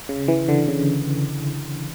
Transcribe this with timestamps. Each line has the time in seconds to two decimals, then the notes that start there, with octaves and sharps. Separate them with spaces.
0.09 C#3
0.28 E3
0.48 D3
0.68 C#3